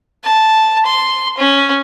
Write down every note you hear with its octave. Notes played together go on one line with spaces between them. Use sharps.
A5
C6
C#4